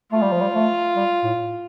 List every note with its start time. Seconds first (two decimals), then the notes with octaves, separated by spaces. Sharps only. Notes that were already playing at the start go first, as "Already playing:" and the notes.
0.12 A3 F4
0.22 G3
0.32 F3
0.41 G3
0.54 A3
0.96 G3
1.24 A2